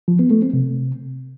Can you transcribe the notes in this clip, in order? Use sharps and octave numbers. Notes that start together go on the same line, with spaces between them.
F3
B3
A3
C4
C3